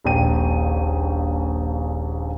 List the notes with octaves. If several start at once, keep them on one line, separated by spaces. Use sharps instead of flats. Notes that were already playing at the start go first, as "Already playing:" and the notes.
D#1 A#1 G5 D#7